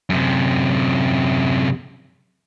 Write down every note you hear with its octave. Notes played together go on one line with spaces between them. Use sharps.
F#2 C3